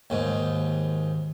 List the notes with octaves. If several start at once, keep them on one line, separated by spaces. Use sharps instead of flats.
D#2 G#2